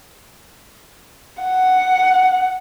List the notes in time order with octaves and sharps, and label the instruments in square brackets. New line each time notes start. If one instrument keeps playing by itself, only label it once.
[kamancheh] F#5